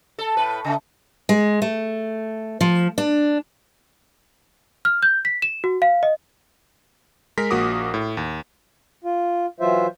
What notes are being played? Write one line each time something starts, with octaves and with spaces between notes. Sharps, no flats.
A4
A2 B4
C#3 A3
G#3
A3
F3
D4
F6
G6
B6
E7
F#4
F5
D#5
G#3 A#4 A#6 B6
A#1 A#3 F#4 D6 D#6
A2
D#2
F4
E3 F#3 F4 C5 E5